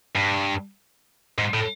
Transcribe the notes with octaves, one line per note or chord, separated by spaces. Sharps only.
G2
G#2
A2